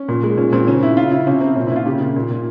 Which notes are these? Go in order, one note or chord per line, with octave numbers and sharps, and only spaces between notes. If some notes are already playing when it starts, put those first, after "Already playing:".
Already playing: C#4
A#2
G#3
A#2 C#4
A#2 C4
C#3 C#4
C#3 E4
C#3 F4
C#3 E4
C3 C#4
C3 C4
A#2 C#4
E4
A#2 F4
C#3 G4
C#3
A#2
A#2